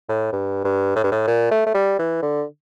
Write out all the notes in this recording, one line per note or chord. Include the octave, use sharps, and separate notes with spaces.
A2
G2
G2
A2
G2
A2
A#2
A3
A3
G3
E3
D3